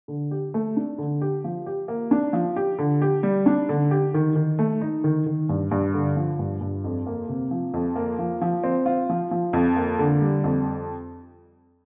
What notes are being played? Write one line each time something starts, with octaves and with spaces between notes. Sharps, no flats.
D3
G4
A3
D4
D3
G4
F3
G4
A#3
D4
F3
G4
D3
G4
G3
D4
D3
G4
D#3
D#3
A3
D#4
D#3
D#3
G2
G2
D3
F3
G2
G2
F2
A#3
C3
F3
F2
A#3
F3
F3
C4
F4
F3
F3
F2
A#3
D3
G3
F2